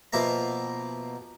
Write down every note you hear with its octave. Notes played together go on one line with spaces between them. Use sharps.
B2 F3 A#3 E5 A#5